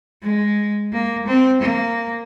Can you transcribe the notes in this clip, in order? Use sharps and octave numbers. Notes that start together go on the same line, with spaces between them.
G#3
A#3
C4
A#3